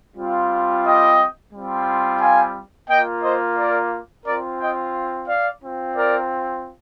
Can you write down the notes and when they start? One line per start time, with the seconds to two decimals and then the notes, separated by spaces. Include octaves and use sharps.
0.16 G3 C4 F4
0.85 D#5 G5
1.53 G3 C4 F4
2.21 F5 G#5
2.89 A#3 F4 D#5 G5
3.24 C5 D#5
3.58 A#4 D5
4.26 C4 F4 A#4 D5
4.60 D#5 G5
5.28 D5 F5
5.63 C4 F4
5.97 A#4 D5